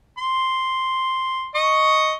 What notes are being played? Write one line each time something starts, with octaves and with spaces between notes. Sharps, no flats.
C6
D#5 C#6 D#6